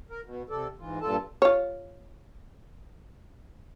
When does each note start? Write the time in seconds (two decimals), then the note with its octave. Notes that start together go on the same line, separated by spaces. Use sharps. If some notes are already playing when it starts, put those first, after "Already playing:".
0.10 A#4
0.25 B2
0.50 C3 A4 D5
0.79 G#2 E3 F4
1.01 G2 A#2 F4 A4 A5
1.42 F4 C#5